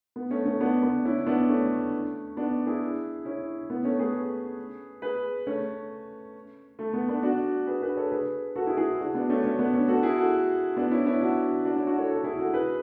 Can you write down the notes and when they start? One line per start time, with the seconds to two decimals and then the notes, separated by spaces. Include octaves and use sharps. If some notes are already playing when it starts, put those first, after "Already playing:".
0.16 B3
0.31 A3 C#4
0.45 A3 C#4
0.60 B3 D4
0.82 B3 D4
1.05 C#4 E4
1.26 B3 D4
1.48 A3 C#4
2.37 B3 D4
2.66 E4 G#4
3.25 C#4 E4
3.70 B3
3.85 A3 C#4
3.99 G#4 B4
5.02 G#4 B4
5.47 A3 C#4
6.79 A3
6.93 B3
7.08 B3 D4
7.23 D4 F#4
7.67 G#4 B4
7.82 G#4 B4
7.97 A4 C#5
8.12 G#4 B4
8.56 F#4 A4
8.67 E4 G#4
8.77 E4 G#4
9.00 D4 F#4
9.14 B3 D4
9.29 A3 C#4
9.44 A3 C#4
9.59 B3 D4
9.73 A3 C#4
9.88 F#4 A4
10.03 E4 G#4
10.18 F#4 A4
10.77 B3 D4
10.91 C#4 E4
11.06 C#4 E4
11.21 D4 F#4
11.65 D4 F#4
11.76 C#4 E4
11.87 D4 F#4
11.98 A4 C#5
12.09 F#4 A4
12.24 E4 G#4
12.39 F#4 A4
12.53 G#4 B4